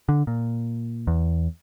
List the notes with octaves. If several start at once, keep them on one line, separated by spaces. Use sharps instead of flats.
D3
A#2
E2